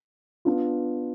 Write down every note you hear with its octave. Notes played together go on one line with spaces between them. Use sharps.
B3 D4 F4